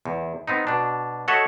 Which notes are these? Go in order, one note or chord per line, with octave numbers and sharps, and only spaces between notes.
E2
B3 C4 D#4
B2 D4
F#4 A4 C#5 D#5 E5 F#5